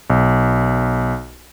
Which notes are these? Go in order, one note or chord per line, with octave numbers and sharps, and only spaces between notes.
B1